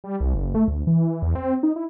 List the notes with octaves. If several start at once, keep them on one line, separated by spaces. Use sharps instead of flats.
G3
C2
F#1
A3
D2
E3
E2
C4
D#4
E4